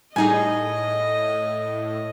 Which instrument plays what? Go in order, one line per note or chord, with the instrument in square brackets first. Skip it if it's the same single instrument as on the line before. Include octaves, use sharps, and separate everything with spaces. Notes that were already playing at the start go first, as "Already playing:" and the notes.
[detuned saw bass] A2 [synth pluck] G3 D#4 G#4 [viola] D#5 [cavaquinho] G#5